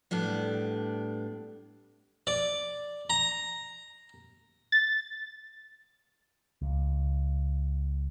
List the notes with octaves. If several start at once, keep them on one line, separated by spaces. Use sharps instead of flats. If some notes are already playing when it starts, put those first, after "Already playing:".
A2 G3 B3 D4
D5
A#5
A6
C#2